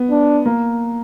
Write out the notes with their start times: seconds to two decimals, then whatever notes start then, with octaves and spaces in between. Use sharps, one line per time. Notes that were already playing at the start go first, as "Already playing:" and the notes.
Already playing: B3
0.11 D4
0.45 A#3